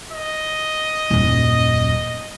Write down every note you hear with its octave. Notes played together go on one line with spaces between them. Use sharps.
D#5
D#1 F#2